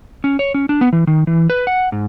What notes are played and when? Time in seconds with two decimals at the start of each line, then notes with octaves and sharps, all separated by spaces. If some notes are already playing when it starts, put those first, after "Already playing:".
0.24 C#4
0.39 C#5
0.54 C#4
0.69 D4
0.81 B3
0.93 E3
1.07 D#3
1.27 E3
1.50 B4
1.67 F#5
1.92 G#2